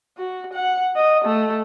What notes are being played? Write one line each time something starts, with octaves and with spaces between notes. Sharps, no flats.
F#4
F#5
D#5
A3